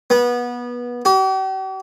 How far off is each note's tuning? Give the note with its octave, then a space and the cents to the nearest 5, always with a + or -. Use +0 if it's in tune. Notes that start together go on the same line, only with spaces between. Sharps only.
B3 -25
G4 -45